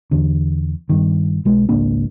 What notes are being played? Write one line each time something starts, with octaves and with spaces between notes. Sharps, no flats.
E2 D3
G2 D#3
B1 G#3
G#1 C#2 A#3 D4